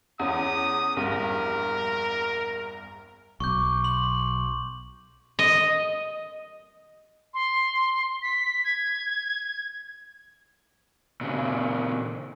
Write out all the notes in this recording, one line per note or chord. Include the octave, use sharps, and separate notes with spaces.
E2 C#4 D#6
A#1 E2 G2 A#4
B1 C#6 D6 G6
C6 F#7
D#5
C6
B6
G#6
A#2 C#3